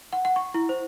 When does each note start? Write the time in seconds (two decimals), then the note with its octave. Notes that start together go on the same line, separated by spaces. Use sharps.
0.13 F#5
0.25 F#5
0.36 C#6
0.54 E4
0.69 C5